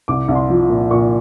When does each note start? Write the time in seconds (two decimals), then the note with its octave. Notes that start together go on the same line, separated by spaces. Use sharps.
0.08 C2 D6
0.28 C2
0.35 C6
0.50 F3
0.70 A#2
0.90 A#2 C#6